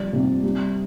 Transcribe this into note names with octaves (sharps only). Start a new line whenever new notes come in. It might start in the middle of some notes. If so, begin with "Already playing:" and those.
Already playing: F3 G3 D5
C3
G3